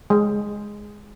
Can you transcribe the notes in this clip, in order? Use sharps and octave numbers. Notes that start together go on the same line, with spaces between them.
G#3